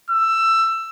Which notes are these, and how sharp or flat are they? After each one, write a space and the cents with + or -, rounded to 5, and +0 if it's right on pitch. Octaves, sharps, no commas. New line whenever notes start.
E6 +15